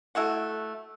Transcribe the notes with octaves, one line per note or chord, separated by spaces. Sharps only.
A3 E4 F#4 F#5